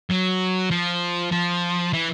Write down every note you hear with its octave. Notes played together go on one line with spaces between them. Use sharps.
F#3
F3
F3
E3